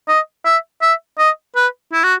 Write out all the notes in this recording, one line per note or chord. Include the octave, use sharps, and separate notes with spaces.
D#5
E5
E5
D#5
B4
E4
F#4